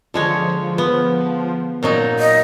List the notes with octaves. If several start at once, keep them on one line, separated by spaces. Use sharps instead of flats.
D3 F3 G#3 C#5
B3
A#2 F#3 D#4
D#5